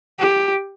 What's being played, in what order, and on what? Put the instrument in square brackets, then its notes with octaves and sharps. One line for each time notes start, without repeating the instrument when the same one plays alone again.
[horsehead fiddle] G4